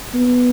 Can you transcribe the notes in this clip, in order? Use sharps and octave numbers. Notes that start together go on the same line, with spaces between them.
B3